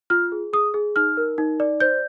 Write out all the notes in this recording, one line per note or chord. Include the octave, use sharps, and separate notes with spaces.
F4 F6
G#4
G#4 D#6
G#4
D#4 F6
A#4
D#4
D5
C5 G6